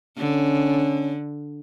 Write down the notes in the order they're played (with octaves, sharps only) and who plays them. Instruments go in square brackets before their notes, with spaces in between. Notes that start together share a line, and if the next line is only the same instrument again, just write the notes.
[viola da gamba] D3 [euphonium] C#4